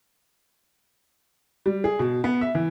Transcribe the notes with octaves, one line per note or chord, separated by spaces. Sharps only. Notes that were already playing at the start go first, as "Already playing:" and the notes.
G3
G#4
B2
B3
E5
E3